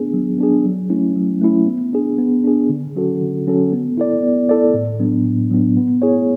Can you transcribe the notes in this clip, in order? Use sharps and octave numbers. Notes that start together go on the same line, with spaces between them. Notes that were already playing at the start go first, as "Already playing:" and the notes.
Already playing: B3 D4 G#4
F#3
B3 D4 G#4
F#3
A3 C#4 E4
F#3
A3 C#4 E4
B3
D4 G#4
B3
D4 G#4
D3
F#3 C#4 F#4 A4
D3
F#3 C#4 F#4 A4
B3
E4 A4 D5
B3
E4 A4 D5
A2
F#3 B3 D4
A2
F#3 B3 D4
B3
E4 G#4 C#5